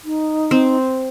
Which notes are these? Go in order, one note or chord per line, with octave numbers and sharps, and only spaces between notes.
D#4
C4